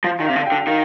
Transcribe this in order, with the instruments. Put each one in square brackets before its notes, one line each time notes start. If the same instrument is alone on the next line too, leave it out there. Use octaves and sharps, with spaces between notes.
[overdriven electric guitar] F3 [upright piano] F5
[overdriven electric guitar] D#3
[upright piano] F5
[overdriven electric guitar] C3
D3
[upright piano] G5
[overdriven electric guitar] D3
[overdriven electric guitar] D#3 [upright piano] F5